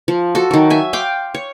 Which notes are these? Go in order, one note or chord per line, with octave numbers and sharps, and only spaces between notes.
F3
F#4 A4
D#3 F#3
E5 G#5
F5 G5 C6 D6
C#5